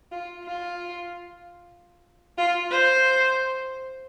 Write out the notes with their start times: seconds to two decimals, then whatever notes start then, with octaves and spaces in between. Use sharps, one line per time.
0.12 F4
0.44 F4
2.38 F4
2.71 C5